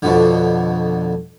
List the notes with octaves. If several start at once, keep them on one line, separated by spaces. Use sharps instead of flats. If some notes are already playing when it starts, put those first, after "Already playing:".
F2 B2 D3